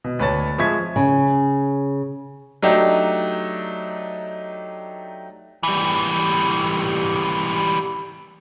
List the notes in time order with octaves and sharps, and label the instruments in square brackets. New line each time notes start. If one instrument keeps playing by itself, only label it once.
[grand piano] B2
D2 B4 C#5 A5 A6
F3 G#3 E5 C#6 G#6 B6
[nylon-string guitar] C#3
[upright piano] F#3 A3 D4 D#4 G4
[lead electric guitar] E3 G3